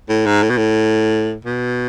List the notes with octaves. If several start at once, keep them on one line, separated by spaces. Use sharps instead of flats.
A2
G#2
A2
B2
A2
B2